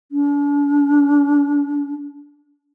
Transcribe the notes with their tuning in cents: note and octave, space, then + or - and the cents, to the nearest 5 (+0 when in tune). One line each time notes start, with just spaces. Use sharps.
D4 -40